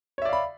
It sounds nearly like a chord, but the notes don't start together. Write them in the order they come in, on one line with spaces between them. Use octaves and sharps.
C#5 E5 D5 F5 B5